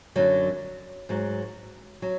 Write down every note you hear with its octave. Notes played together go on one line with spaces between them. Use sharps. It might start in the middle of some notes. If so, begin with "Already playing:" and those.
F#2 D3 F#3
G#2 F#3
F#3